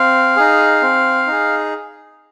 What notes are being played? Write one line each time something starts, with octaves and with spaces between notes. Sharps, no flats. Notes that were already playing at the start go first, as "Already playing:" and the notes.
Already playing: C4 F5
D#4 G#4
C4
D#4 G#4